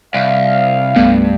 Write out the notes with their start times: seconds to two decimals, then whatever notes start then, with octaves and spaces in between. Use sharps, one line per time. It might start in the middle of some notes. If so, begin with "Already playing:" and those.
0.14 C2 F5
0.96 C2 G2 A3 B3